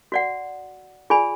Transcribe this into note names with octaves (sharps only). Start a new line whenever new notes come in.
F#4 D5 F#5
F4 G#4 D5 G#5 B5